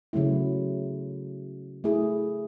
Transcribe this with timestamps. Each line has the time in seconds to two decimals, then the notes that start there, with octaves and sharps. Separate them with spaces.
0.13 C#3 F#3 A3 E4
1.84 A3 E4 G#4